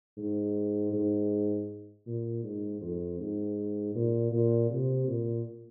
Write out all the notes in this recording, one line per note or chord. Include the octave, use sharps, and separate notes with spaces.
G#2
G#2
A#2
G#2
F2
G#2
A#2
A#2
C3
A#2